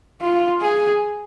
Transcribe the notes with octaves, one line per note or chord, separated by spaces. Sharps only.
F4
G#4